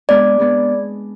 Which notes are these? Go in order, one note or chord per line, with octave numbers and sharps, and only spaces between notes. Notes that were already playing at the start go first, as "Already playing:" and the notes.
G#3 B3 D4 D5
G#3 B3 D4